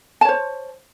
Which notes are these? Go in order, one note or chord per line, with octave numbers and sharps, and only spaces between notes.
C5 C#5 A5